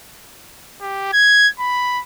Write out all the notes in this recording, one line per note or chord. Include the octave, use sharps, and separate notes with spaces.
G4
G#6
B5